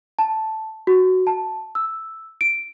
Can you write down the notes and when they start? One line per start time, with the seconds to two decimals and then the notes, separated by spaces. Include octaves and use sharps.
0.19 A5
0.87 F#4
1.27 A5
1.75 E6
2.41 D7